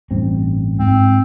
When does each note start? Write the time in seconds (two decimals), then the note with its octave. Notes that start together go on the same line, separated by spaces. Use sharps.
0.11 A1 G2 C4
0.79 G#2 C4